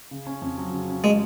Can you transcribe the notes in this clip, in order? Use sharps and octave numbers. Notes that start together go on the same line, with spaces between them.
C#3
C#4
F2
F#3
C#3
C#4
G#3